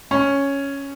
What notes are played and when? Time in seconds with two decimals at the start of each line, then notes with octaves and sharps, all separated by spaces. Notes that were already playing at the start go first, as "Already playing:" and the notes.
0.11 C#4